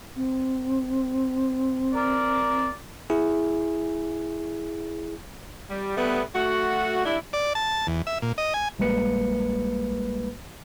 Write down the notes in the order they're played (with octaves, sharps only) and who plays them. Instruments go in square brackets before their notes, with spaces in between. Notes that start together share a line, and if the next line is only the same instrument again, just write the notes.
[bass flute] C4
[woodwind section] A#4 D5
[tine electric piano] E4 G#4
[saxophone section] G3
G3 A3 B3
A3 F#4
G3 D4 E4
[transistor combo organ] D5
A5
E2
E5
A#2
D#5
G#5
[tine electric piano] A#1 G3 G#3 A#3 B4 C#7